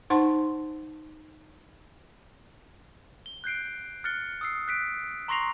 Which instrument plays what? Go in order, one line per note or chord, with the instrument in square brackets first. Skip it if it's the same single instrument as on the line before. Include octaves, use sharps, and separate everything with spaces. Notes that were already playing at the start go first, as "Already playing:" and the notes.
[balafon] D#4 C5 F#5 A5 C6
[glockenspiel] G7
F#6 G6 C7 D7
F6 F#6 A6 C#7 G7
D#6 E6 C7
F#6 B6 D7
A#5 C6 C#6 A#6 C7 F7